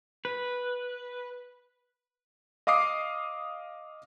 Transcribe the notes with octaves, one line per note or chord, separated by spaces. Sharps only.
B4
D#5 F5 D6 D#6 C7